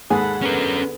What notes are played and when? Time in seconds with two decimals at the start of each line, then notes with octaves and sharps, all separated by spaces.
0.10 D#2 G#2 G#3 G#4 A4 B4 F#5
0.42 D3 B3 C#4 A#4